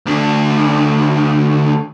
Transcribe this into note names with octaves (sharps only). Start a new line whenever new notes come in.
D2 D4